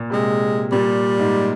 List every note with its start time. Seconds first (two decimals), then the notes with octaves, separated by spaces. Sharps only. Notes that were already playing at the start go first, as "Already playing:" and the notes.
Already playing: A#2
0.10 C3 G#3
0.72 A#2 G3
1.19 G#2